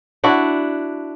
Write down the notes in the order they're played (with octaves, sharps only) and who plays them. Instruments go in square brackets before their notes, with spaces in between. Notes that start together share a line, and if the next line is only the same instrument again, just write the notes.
[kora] D4 E4 F#4